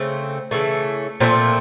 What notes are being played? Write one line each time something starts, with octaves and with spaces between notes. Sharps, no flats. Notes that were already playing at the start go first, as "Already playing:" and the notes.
Already playing: C#3 A3 C4
C#3 E3 A3
A#2 F3 A3 C4